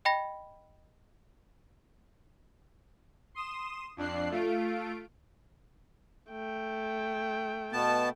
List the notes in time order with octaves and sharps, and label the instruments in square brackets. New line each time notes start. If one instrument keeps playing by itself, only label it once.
[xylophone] D#5 G5 B5 A#6
[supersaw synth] C6 D#6 E7
F2 D4 F#6 C7
A3 F4 D7
[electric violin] A3 G5
[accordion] B2 B3 A5